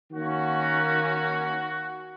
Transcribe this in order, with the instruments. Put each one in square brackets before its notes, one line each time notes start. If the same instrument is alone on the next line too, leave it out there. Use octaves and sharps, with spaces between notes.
[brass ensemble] D#3 A#3 C#4 F#4